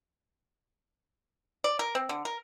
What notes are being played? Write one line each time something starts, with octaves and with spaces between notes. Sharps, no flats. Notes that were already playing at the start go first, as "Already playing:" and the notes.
D5
A#4
C4
D3
A#4